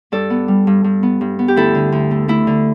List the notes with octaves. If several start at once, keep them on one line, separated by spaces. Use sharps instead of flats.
G2 A4 D5
B3
G3
G2
G2
B3
G2
B3
G4
D2 E4 A4
D3
D2
A3
A3 E4
D3